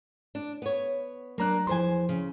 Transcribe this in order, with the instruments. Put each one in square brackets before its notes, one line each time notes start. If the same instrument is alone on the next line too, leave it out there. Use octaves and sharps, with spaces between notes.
[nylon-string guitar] D4
B3 C#5
[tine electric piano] F#3 A#5 F#6 [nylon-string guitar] A#3 D4
[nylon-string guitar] E2 C5 G#5 [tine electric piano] F3 C6
[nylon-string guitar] C#3